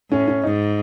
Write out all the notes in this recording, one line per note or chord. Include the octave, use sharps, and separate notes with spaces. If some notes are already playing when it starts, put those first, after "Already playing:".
A2 C#4
C#4
G#2 D#4